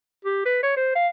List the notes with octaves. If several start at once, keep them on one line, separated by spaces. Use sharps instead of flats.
G4
B4
C#5
C5
F5